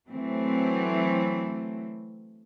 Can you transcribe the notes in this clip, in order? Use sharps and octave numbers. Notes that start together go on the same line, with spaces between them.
E3 F#3 A3 C4